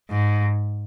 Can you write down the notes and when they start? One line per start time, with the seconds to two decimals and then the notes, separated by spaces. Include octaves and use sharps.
0.10 G#2